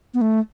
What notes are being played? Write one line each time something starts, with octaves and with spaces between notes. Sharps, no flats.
B3
A3